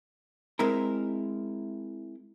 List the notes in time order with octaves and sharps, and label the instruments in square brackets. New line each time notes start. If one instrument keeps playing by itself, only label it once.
[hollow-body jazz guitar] G#3 C4 E4 A#4